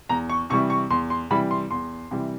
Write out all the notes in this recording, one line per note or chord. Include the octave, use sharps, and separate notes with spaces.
E2 A#5
C#6
C3 E3 G3 C#6
C#6
E2 C6
C6
C3 E3 G3 B5
C6
E2 C6
C3 E3 G3